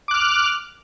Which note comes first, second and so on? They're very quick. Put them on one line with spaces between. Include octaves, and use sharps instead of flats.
D6 F#6 F6